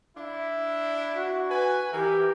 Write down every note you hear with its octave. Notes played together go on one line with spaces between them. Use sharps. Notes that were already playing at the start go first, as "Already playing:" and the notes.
D4 E4
F#4
B4 G#5
E3 G4 A#4